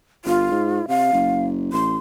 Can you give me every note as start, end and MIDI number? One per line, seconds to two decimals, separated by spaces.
0.25 0.51 31
0.25 0.86 65
0.52 0.81 44
0.88 1.11 48
0.88 1.45 77
1.13 1.69 30
1.73 1.98 33
1.73 1.98 84